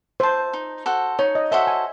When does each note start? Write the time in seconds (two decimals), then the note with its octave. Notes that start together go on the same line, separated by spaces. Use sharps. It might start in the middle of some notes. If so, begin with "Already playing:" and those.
0.20 C5 E5 A5
0.53 D#4
0.86 F#4 A4 C5
1.19 D#4 C#5
1.35 D#5
1.52 F#4 A4 C5 E5
1.67 G#5